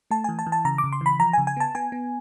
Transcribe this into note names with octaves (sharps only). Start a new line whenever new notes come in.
A3 A5
E3 G#5
A5
E3
A5
C#3 A#5
D6
C#3
C6
E3 B5
F3 A#5
C#3 G#5
G#5
B3 A5
B3 G#5
B3